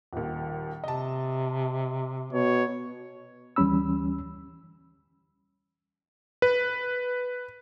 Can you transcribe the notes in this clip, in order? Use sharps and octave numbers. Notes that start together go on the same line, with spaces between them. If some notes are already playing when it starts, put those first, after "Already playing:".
D#1 D#2
C3 D#5 A5
B2 C#5
D2 E3 G3 C#4 B5 E6
B4